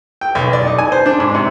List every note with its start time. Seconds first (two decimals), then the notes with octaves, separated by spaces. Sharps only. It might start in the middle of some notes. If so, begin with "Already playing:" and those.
0.21 G5
0.35 B1
0.53 D5
0.67 D#4
0.78 G#5
0.92 C5
1.06 D4
1.20 G#2
1.35 C3